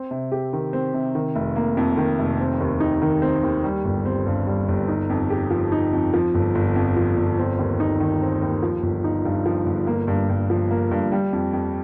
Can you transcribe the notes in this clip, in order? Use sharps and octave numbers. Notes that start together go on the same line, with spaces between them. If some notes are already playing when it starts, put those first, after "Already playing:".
Already playing: C4
C3
G4
D#3
C4
C3
D#3
F1
A#3
F2
D#3
F1
C4
D#2
D#4
D#3
C4
D#2
G3
G1
C4
G2
G3
G1
D#4
F2
G4
F3
D#4
F2
F3
G1
G1
F2
F3
G1
C4
D#2
D#4
D#3
C4
D#2
F3
G1
D#4
G2
F3
G1
A#3
G2
G2
F3
A#3
G2
G3
F2
F2